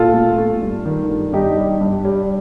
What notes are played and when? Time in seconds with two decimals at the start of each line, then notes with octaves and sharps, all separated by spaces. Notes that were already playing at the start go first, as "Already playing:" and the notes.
Already playing: A#2 F4 A4
0.14 A3
0.38 A3
0.61 G2
0.85 D#3
1.09 G2
1.33 G2 D#4 G4
1.57 G3
1.81 G2
2.05 G3